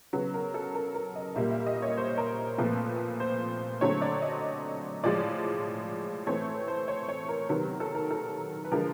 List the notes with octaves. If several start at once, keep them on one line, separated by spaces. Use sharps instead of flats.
C#3 F#3 B3
A#4
A4
A#4
A#4
D#5
A#2 G3 A#3 E5
E5
D#5
C#5
C5
A#4
A#2 F3 A3 C4 B4
C5
D3 F#3 A3 C4 C#5
D5
D#5
A2 F3 G#3 D5
E3 A3 C4 C#5
C5
C#5
C#5
A#4
C3 D#3 F#3 B3 A#4
A4
A#4
A4
B4
D3 F3 G#3 A#4